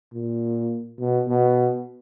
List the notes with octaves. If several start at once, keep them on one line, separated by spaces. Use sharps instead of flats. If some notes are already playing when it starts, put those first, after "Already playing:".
A#2
B2
B2